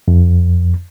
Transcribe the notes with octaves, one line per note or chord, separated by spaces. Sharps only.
F2